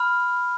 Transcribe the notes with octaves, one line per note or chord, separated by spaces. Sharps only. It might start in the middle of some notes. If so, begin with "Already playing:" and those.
Already playing: B5 F6